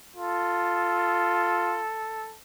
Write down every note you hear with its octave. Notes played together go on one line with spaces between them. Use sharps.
F4 A4